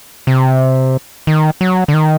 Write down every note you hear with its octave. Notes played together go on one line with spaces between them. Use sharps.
C3
D#3
F#3
D3
D#3